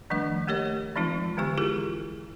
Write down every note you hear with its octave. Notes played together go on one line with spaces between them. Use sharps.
D#3 F3 G3 A3 D4 D#5
A3 A#3 G4 A#4 C#5 D#5
E3 F3 G#3 C4 D#4 F4
D3 E3 G#3 B3 G4 C#6
E4 F4 G4 G#4 A#4